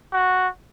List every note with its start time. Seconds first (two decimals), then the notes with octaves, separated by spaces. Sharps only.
0.13 F#4